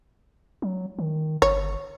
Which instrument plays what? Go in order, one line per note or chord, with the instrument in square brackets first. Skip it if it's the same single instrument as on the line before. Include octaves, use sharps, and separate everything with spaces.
[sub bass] F#3
D#3
[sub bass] G1 [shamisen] C#5